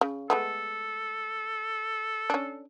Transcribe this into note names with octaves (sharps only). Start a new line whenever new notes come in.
C#3
G#3 A3 B3 A4
C#4 D4